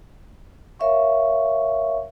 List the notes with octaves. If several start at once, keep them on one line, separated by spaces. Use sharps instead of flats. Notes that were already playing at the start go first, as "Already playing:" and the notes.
A#4 C#5 E5 F5 C#6